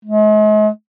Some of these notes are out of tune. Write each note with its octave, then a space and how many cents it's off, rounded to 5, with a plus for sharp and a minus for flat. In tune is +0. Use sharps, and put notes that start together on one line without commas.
G#3 +40